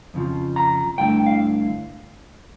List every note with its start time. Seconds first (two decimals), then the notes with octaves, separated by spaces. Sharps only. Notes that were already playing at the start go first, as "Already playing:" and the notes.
0.14 F2 C#3 F3
0.56 A#5
0.98 G2 D3 A3 E4 G5
1.26 F5